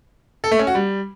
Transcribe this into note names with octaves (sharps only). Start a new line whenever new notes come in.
A4
A3
C#4
F#4
G3